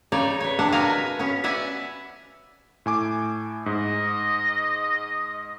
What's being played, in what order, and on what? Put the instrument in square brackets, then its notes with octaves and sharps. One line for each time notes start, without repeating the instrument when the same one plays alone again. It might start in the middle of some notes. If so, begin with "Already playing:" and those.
[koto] C#3 D#4 C#5 D5
B4 C#5
C3 D4 F#5 A5
F#4 A#4 B4 D#5 F5 G#5
B3 C#4
D5 E5 F#5 G#5
[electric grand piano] A2 G#5 D6
[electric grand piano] G#2 [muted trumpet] D#5